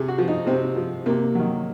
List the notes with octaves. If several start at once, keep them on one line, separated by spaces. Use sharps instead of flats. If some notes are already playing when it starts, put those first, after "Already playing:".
Already playing: C3 G#4
F#4
F3
D#4
C3 C4
F3
C3 A#3
D#3 F#3